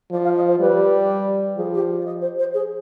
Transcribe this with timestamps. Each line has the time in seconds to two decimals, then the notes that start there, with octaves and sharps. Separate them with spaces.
0.11 F3 D5
0.24 F5
0.36 D#5
0.47 C5
0.60 G3 B4
1.57 F3 G#4
1.73 G4
1.98 D5
2.05 D#5
2.21 C5
2.38 C5
2.53 G#4